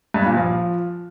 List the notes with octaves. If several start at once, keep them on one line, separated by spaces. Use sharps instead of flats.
G2
A#2
F3